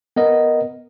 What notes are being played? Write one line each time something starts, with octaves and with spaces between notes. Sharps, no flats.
B3 A#4 D#5